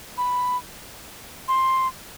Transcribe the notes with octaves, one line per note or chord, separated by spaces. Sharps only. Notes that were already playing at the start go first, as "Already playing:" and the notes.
B5
C6